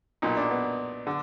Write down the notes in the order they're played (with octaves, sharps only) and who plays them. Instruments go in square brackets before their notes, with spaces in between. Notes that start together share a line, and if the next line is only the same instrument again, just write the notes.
[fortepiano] B1 A#2 D#4
D4
B3
D3